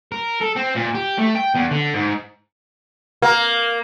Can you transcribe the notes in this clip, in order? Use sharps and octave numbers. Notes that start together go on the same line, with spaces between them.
A#4
A4
C4
A#2
G4
A3
G5
E2
D3
G#2
A#3